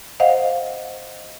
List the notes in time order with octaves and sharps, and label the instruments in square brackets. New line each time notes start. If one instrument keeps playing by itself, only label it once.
[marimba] C5 D#5 F5 F#5